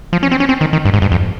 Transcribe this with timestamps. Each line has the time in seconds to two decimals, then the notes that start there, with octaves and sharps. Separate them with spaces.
0.13 F3
0.23 C#4
0.32 C4
0.40 C#4
0.49 C4
0.61 D#3
0.73 D#3
0.85 G2
0.94 G#2
1.02 G2
1.12 F2